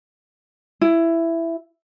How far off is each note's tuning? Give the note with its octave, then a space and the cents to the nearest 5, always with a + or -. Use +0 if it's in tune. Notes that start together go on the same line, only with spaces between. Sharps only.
E4 +10